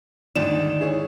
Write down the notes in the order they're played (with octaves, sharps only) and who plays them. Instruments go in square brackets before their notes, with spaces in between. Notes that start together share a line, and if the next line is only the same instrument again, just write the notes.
[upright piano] D2 G#2 E7 [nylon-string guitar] D#3 D5
[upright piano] E4 G#4 C#5